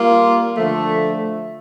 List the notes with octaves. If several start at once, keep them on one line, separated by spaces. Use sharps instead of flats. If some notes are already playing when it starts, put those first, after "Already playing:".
Already playing: G3 A#3 F4
D3 F3 A3